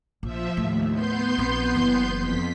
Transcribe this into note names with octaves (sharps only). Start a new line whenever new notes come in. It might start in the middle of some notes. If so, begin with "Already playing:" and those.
A#1 F3 E5
D#2 A2 A3
B3 C6 G6
A#1 C4
F#1 E3
F2 B6